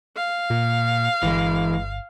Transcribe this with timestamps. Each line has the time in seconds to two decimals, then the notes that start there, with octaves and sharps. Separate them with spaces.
0.17 F5
0.50 A#2
1.23 G1 E3 G#3